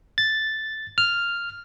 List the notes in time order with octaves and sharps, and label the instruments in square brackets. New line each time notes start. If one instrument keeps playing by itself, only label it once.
[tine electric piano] A6
F6